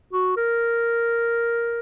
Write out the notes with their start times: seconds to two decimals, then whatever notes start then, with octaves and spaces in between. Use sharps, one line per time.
0.13 F#4
0.37 A#4